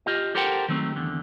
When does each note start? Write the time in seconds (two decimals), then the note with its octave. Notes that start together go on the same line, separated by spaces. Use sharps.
0.06 F4 G4 D#5
0.35 G4 A4 A#4 C5 F#5 G5
0.68 D#3 F#3 A3 C4
0.96 E2 D3